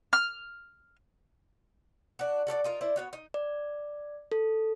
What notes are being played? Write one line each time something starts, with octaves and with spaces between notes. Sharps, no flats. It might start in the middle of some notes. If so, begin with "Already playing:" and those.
F6
D4 F#4
F#4 A4 C#5 D5
D#4 F4 A#4
E4 C5 D5
B3 F#4 C#5
D#4
D5
A4